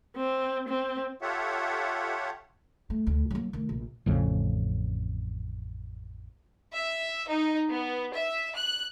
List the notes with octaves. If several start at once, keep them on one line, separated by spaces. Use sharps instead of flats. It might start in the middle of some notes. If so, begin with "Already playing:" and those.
C4
C4
F4 G4 A4 C#5 E5 F#5
A3
D2
F#3 A#3
D#3 A3
A#1
A1 F2 C#3
E5
D#4
B3
E5
F#6